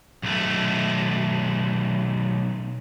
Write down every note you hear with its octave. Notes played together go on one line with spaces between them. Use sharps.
B1 A3